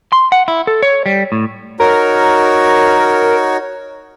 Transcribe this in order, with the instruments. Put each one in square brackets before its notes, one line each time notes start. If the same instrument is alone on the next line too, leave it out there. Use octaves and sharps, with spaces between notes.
[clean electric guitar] C6
F#5
E4
A4
C#5
G3
A2
[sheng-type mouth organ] D#4 F#4 C#5 [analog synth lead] A#4